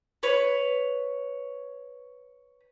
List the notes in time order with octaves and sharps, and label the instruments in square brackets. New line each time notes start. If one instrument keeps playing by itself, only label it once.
[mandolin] B4 C#5